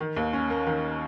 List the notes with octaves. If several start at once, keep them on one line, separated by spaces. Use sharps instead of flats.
D#3
D#2
C#4
A#3
D#3